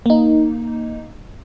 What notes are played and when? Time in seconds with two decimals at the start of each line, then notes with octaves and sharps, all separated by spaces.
0.06 A#3 D#4